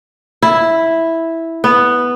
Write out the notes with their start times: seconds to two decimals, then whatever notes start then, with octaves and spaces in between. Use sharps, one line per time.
0.42 E4
1.64 B3